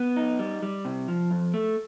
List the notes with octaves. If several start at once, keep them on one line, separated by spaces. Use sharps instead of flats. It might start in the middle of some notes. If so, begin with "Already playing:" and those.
Already playing: B3
D#4
G3
G3
C3
F3
F2
A3